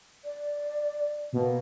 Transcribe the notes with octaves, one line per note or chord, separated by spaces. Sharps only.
D5
B2 A#3